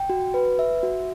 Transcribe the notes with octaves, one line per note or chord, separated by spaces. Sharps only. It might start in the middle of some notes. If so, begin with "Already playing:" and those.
Already playing: G5
F#4
B4
E5
F#4